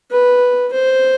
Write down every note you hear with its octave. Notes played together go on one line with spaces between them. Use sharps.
B4
C5